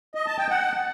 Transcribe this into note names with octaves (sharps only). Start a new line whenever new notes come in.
D#5
A5
G5
F#5